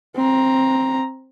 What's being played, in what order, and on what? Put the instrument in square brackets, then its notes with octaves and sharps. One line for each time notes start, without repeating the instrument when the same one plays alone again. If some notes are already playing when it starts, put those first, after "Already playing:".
[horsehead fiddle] C4 A#5